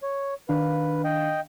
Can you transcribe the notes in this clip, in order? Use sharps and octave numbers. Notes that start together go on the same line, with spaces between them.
C#5
D#3 D4 B4 F5
D#5 G5